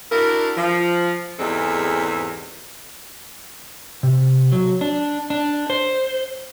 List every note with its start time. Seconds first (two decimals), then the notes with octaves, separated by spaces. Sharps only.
0.12 D4 E4 F#4 A#4
0.57 F3
1.40 E2 G#2 G3 G#3 C4 A4
4.03 C3
4.52 F#3
4.81 D4
5.30 D4
5.70 C5